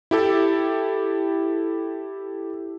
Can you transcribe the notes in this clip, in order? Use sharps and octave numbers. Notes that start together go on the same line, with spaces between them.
E4 G4 A4